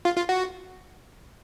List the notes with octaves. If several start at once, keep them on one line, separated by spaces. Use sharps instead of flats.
F4
F4
F#4